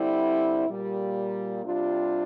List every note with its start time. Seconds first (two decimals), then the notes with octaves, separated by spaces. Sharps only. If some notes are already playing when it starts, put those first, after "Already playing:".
Already playing: D3 G3 C4 E4
0.68 A#2 G3 A#3
1.63 C3 G3 D4 F4